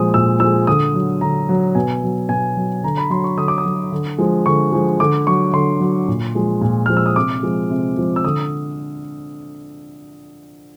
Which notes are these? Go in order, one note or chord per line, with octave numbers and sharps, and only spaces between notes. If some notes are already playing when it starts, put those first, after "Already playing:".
Already playing: A#2 F3 G#3 D#6
A#2 E6
F3 G#3 E6
D3 D#6
F#3
D3 A#5
F#3
B2 G#5
F#3
B2 G#5
F#3
D3 A#5
B5
F#3 C6
C#6
D3 D#6
D6
D#6
F#3
D3
F3 G#3
D3 C#6
F3 G#3
D3 D6
F#3 C#6
D3 C6
F#3
A#2
F3 G#3
A#2
F3 G#3 F6
E6
D#6
C3 D6
F3 G#3
C3
F3 G#3
E6
D3 D#6